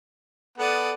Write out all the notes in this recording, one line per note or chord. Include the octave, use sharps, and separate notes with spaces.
B3 A4 D5 F#5 D#6